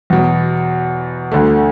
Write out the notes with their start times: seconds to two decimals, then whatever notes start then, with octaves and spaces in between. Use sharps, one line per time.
0.10 E2 B2 F#3
1.32 D2 D3 A3